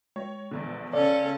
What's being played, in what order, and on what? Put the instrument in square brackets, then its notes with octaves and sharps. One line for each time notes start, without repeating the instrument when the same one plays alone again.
[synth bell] G#3 [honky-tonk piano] C#5
[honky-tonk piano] A#1 E2 D3
[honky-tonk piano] C#2 [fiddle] C#4 A4 [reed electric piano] D5